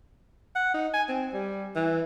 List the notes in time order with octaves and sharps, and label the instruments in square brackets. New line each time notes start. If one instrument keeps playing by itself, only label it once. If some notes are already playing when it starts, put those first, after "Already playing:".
[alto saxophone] F#5
D#4
G#5
C4
G3
E3